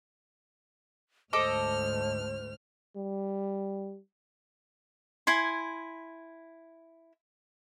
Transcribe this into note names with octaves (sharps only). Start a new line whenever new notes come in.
D2 G#2 A4 C5 D#5 D6 F6
G3
E4 G#5 C6